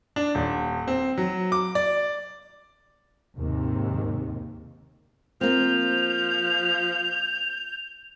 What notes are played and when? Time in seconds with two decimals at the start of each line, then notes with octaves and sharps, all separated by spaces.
0.16 D4
0.35 D#1
0.88 C4
1.18 F#3
1.52 D6
1.75 D5
3.36 D#2 G#2 C3 D#3
5.41 F3 A#3 C4 G6 F7